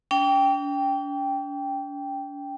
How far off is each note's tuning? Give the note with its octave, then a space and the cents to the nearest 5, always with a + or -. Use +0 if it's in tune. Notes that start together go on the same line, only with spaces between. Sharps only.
D4 -45 G5 +0